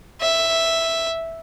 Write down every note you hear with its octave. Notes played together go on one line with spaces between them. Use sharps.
E5